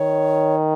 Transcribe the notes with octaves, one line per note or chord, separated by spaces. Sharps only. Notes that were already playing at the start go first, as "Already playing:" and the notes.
Already playing: D#3 C#5